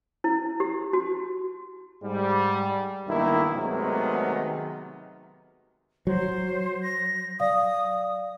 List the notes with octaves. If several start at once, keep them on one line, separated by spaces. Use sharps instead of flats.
E4
G4
F#4
G#2 G3
B1 G2 D#3 A#3 E4
C3 D#3 F#3 G#3 A3 B3
F#3 C5
A#6
D5 F5 D#6